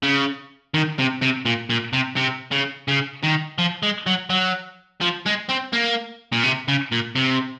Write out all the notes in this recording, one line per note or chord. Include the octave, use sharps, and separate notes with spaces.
C#3
D#3
C3
C3
A#2
A#2
C3
C3
C#3
C#3
D#3
F3
G#3
F#3
F#3
F3
G#3
C4
A#3
A#2
C3
C#3
A#2
C3